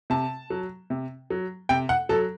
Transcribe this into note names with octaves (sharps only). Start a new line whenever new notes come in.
C3 A5
F#3
C3
F#3
C3 G5
F#5
F#3 A4